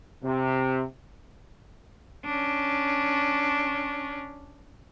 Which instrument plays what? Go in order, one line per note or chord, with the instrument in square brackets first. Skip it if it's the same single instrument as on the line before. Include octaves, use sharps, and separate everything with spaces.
[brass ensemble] C3
[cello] C#4 D4